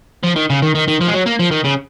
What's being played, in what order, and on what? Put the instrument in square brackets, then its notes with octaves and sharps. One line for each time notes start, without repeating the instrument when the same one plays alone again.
[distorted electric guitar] F3
D#3
C#3
D#3
D#3
D#3
F3
G#3
F#3
A#3
F3
D#3
C#3